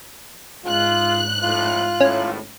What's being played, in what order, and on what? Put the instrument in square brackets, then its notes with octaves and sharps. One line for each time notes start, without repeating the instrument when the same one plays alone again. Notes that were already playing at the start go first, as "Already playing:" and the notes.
[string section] G#2 F#6 [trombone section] G#3 F4
[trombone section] F2 A2 [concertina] F4
[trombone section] G#1 A2 [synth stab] C#4